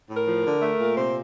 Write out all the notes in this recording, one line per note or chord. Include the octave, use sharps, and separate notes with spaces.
A2
A#4
F3
D3
A3
A#2
C3 C5